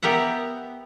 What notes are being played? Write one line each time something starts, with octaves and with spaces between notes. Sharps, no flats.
B3 G4 A#4 E5 F#5